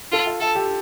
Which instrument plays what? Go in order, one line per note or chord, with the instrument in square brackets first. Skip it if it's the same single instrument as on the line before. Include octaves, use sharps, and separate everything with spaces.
[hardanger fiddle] F4 [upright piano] A4
[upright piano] F4
[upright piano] F4 [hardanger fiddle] A4
[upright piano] G4